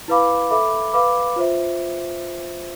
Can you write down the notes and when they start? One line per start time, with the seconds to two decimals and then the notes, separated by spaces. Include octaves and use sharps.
0.08 E4 B4 F5 B5 D6
0.51 A4 E5 B5 D6
0.93 B4 F5 B5 D6
1.36 F4 C5 E5